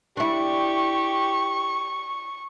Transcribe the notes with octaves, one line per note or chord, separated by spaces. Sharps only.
D4 E4 G4 C#6